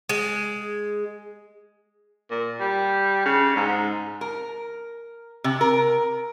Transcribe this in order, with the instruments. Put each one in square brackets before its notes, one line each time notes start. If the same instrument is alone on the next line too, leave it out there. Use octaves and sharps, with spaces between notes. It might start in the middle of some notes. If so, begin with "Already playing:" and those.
[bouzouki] G#3
[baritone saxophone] A#2
G3
C#3
G#2
[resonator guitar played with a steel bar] A#4
C3
A#4